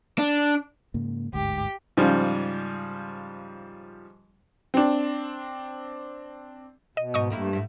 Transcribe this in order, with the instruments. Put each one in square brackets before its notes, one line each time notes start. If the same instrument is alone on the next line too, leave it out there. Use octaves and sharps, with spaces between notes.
[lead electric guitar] D4
[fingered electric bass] G#2 C#3 A#3
[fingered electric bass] G1 D2 G#2 [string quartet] G4
[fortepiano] G#2 C#3 F3 G3
[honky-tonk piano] C4 D4
[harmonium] B2 [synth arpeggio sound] D#5
[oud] G#2 [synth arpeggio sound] D#5 C#6 D#6
[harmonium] G2 [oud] A3 A#3 E4
[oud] G#2 E4